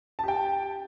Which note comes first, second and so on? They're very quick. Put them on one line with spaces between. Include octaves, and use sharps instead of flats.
A5 G4 G5